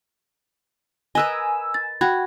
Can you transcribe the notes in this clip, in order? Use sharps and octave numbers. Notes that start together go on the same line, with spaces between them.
A#4 B4 D#5 G#5 E6
A6
F#4 G5 B5 G#6